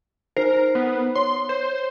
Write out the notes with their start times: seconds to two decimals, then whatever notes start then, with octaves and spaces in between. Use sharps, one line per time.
0.37 D#4 A#4 C5 C7
0.75 B3
1.15 C#5 C6
1.49 C5